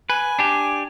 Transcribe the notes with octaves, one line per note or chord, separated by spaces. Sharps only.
B4 G#5
D4 G4